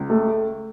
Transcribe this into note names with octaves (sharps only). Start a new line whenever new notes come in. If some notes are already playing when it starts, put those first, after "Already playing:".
Already playing: C#2
A3